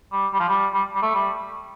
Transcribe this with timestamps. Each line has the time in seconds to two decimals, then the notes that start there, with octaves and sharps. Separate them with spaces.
0.12 G3
0.33 G3
0.40 F3
0.48 G3
0.74 G3
0.96 G3
1.02 A3
1.15 G3